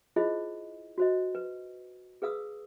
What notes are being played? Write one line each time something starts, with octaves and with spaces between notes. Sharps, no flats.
E4 F4 G#4 C5 D#5
F#4 C5 D#5
B4
G#4 B4 F5 D#6 E6